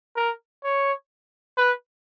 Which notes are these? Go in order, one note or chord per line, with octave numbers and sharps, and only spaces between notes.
A#4
C#5
B4